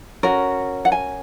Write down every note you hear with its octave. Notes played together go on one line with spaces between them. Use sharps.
C#4 F#4 A#4
F#5
G#5